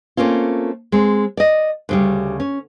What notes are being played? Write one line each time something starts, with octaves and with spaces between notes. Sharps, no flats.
A3 A#3 C4 C#4 F4
G#3 C4
D5 D#5
D2 C#3 G3
C#4